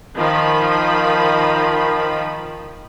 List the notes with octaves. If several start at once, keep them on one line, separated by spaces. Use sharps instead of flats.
D#3 F3 B5